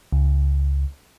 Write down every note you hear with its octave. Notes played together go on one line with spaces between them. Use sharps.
C#2